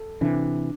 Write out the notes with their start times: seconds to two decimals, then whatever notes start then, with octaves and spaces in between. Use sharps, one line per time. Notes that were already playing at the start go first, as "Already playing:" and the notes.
Already playing: A4
0.21 C3 E3 D4